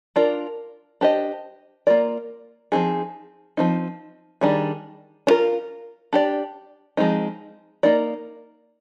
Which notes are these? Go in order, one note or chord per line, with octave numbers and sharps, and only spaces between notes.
D4 F4 A#4 D5
D4 G4 C5 D#5
A#3 F4 A#4 D5
F3 C4 D#4 G#4
F3 C4 D#4
D#3 G3 D4 G#4
D4
F4 A#4
D4 G4 D5
F3 G#3 C4 D#4
A#3 D#4 A#4 D5